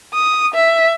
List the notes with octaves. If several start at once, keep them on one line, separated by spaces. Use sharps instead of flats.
D#6
E5